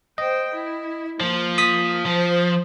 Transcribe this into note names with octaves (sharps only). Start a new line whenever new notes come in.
C5 D#5 G5
E4
F3 A#3
D#6 B6
F3 C5